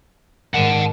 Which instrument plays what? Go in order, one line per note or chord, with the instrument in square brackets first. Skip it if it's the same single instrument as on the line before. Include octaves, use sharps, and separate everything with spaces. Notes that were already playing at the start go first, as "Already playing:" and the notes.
[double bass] G#2 D#3 [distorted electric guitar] F#5 A5